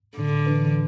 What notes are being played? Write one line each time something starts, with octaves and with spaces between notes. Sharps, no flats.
A2 D3
E3 D4 B4